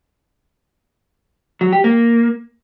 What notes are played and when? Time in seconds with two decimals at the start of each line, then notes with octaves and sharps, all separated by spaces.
1.61 F#3
1.73 G4
1.84 A#3